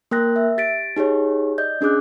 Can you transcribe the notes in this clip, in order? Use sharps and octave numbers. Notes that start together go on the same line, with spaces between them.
A#3 A#4 G5 F#6 A#6
E5
G4 A6 B6 D7
D#4 G4 G#4 C#5
D5 D#5 G6
C#4 D4 G#4 D6 F#6